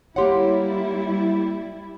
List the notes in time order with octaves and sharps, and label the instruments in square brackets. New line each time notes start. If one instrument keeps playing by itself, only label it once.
[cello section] G3 E4 [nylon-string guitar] A#3 G4 F#5 [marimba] C#5 C6